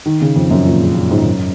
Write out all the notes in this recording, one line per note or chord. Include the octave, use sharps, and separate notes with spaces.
D#3
C#3
F2
F#2
A#2
C#3
A#2
G#2
F#2